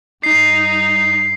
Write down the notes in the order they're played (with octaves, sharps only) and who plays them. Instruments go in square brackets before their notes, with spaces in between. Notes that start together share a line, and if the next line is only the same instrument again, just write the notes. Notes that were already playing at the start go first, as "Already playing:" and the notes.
[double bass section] G2 [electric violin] D#4 [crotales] C7